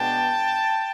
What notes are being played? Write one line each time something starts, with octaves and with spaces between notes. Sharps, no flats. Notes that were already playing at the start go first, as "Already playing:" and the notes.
Already playing: B2 G#3 B3 D4 G5 A5